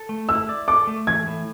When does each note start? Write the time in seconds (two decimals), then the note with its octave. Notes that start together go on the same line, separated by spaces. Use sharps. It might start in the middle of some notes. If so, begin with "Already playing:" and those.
Already playing: A4
0.09 A3
0.29 E4 E6
0.49 D5
0.68 A4 D6
0.87 A3
1.07 E3 G#6
1.27 A2